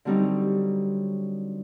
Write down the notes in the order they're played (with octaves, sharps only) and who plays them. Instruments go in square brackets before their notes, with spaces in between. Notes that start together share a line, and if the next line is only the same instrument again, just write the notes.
[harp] D3 F#3 G3 C4 D#4